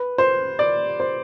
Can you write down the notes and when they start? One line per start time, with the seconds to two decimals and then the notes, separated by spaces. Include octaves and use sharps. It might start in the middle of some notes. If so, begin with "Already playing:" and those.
Already playing: B4
0.18 C5
0.59 D5
1.00 C5